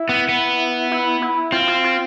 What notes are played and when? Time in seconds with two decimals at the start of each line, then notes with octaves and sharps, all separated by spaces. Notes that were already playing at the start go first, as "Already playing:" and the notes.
Already playing: E4
0.09 B3
0.29 B3
0.91 E4
1.22 E4
1.52 C4 F4
1.68 F4
1.84 F4